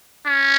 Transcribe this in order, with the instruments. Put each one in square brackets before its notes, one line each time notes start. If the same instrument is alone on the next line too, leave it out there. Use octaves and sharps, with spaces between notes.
[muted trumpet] C#4